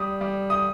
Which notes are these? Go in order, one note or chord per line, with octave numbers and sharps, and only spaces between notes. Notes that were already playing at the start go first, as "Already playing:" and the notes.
Already playing: G3 D#6
G3
D#6